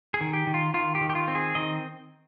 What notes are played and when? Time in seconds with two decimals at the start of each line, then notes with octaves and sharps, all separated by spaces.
0.14 G#4
0.21 D#3
0.33 G4
0.47 D#3
0.54 F4
0.74 D#3 F4
0.95 G4
1.01 D#3
1.10 G4
1.15 F4
1.28 C4
1.35 G#4
1.55 D#3 D#5